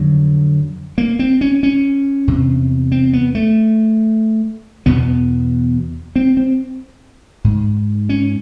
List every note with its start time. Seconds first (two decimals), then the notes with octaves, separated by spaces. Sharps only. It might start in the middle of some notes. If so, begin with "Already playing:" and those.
Already playing: F2 D3 F#3
0.98 A#3
1.19 C4
1.41 C#4
1.63 C#4
2.27 E2 C3
2.92 C4
3.13 B3
3.35 A3
4.86 E2 B2 B3
6.16 C4
6.37 C4
7.44 G#2
8.09 C#4